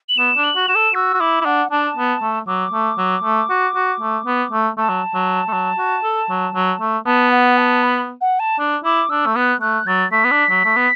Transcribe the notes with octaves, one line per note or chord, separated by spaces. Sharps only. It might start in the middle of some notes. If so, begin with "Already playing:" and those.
F#7
B3 E7
D4
F#7
F#4
F#4 E7
A4
F#4 E6
F#4
E4 D6
E4
D4 F#5
D4 A5
B3
A3
F#3 D6
A3
F#3
A3
F#4
F#4
A3
B3
A3
A3 A5
F#3
F#3
A3
F#3
F#4
A4
F#3
F#3
A3
B3 A5
F#5
A5
B5
F#5
A5
D4
E4 D6
D4 E6
A3
B3 F#6
A3 F#6
F#3 A6
A3 B6
B3
D4
F#3
A3
B3